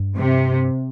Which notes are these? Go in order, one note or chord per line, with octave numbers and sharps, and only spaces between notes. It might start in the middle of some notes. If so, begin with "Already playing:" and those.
Already playing: G2
C3